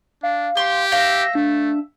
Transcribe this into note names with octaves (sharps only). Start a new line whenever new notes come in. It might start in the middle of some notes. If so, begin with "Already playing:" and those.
D4 F5
G4 C6
E5 F5 G5 A#6
A3 D4